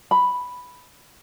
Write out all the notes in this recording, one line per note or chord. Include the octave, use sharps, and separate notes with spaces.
B5